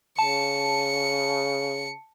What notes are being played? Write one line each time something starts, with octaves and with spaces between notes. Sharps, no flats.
C#3 A5 C#7